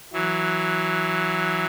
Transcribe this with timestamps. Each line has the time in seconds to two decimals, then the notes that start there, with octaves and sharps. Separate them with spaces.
0.13 E3 F#3